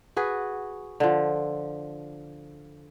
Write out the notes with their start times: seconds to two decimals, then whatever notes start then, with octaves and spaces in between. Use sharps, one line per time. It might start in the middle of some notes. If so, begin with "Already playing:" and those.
0.16 F#4 G#4 B4
1.00 D3 F3